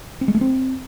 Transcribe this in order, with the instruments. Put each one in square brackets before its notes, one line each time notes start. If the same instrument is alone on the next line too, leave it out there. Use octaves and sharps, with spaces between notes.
[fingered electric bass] C4
G#3
A3
C4